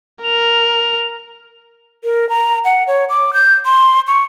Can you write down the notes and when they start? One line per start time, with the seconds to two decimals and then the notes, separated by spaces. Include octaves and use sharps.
0.23 A#4 F7
2.04 A#4
2.29 A#5
2.65 F#5
2.87 C#5
3.09 D6
3.33 G6
3.65 C6
4.07 C#6